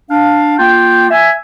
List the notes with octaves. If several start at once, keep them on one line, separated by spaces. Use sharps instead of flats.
D4 F5
A#3 F4 G5
E5 G#5